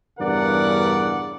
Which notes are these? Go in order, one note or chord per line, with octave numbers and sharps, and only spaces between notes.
E2 G2 C#3 A#4 D5 F#5